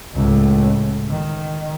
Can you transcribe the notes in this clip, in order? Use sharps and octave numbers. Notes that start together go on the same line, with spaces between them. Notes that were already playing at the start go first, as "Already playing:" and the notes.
C#2 A2
D#3